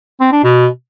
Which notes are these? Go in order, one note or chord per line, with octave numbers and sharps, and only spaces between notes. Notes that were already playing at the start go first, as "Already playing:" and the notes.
C4
D4
B2